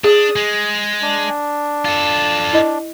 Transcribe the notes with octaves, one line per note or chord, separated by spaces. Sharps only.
D4 G#4 D#6
G#3
D4
F4 A4
E4 D#5